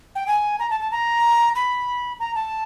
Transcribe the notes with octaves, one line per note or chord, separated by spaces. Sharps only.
G5
G#5
A#5
A5
A5
A#5
B5
A#5
A5